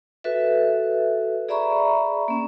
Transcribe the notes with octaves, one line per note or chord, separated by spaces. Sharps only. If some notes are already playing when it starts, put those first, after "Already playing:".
F#4 A4 B4 E5
G#4 D5 E5 A#5 B5 C#6
A#3 C#4